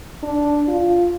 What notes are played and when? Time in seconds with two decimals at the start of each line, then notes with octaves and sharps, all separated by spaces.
0.23 D4
0.68 F4